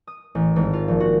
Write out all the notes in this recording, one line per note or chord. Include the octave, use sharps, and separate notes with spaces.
D#6
A1
G#1
F4
A#1
F#4